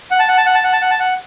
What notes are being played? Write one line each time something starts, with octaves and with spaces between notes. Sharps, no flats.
F#5
A5
F#5
A5
F#5
A5
F#5
A5
F#5
A5
F#5